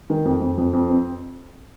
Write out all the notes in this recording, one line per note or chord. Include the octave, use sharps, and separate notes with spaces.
D#3
F2
F2
F2
F2
C4